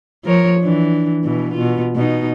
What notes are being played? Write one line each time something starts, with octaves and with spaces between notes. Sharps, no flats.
F3 A#4 C#5
E3 D4
B2 E3
B2 F4
B2 D#4